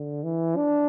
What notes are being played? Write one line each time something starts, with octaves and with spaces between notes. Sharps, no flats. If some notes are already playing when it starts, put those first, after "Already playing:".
Already playing: D3
E3
D4